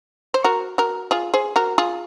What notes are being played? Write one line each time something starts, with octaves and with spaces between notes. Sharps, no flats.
C5
F#4 A#4
F#4 A#4
F4 G#4
G#4 C5
F#4 A#4
F4 G#4